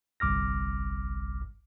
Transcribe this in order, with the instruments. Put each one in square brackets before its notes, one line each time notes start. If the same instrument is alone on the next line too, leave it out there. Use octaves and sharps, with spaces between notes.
[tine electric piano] G1 C2 D6 F6 A#6